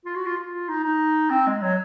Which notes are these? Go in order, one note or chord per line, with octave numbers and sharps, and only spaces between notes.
F4
F#4
F4
F4
D#4
D#4
C4
G#3
F#3